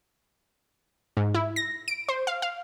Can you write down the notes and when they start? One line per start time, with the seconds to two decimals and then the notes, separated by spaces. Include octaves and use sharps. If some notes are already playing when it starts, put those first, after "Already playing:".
1.17 G#2
1.35 E4
1.56 A#6
1.88 D7
2.09 C5
2.27 F5
2.42 F5